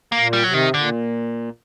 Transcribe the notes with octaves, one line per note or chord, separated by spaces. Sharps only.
A#3
A#2
G3
C3 F#3
D#3
A#2 D3